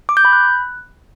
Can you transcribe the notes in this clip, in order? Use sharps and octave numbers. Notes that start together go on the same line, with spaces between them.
D6
G6
B5
F#6